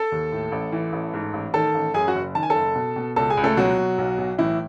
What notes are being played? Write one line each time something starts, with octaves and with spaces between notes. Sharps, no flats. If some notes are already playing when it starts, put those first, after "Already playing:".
Already playing: A4 A5
D#2
A2
A1
E3
A1
G#2
A1
D#3 A4 A5
A1
F#2 G#4 G#5
F#4 F#5
F#1
D#3 A5
G#5
A4 A5
F#1
B2
B2
C#2 A4 A5
G#4 G#5
C#2
A3 A4
B2 F#3 F#4
B2
B1
B1
A2 E3 E4